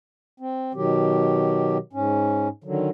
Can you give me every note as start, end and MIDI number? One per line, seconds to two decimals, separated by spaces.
0.40 0.72 60
0.74 1.78 47
0.74 1.78 51
0.74 1.78 54
0.74 1.78 67
1.93 2.48 44
1.93 2.48 61
2.64 2.90 50
2.64 2.90 51
2.64 2.90 54